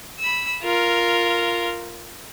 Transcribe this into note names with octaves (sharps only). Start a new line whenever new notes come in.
B5 E6
F4 A#4